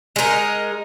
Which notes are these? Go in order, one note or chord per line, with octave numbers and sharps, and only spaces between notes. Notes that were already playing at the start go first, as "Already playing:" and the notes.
G#3 D#4 A#4